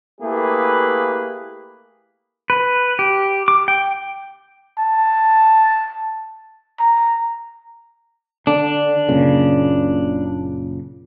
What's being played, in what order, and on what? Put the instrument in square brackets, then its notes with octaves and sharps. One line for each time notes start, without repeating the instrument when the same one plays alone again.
[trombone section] A3 A#3 E4 G4 G#4 B4
[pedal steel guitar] B4
G4
D6
G5
[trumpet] A5
A#5
[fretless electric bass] D3 [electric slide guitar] D4
[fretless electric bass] F#1 A#2 C#3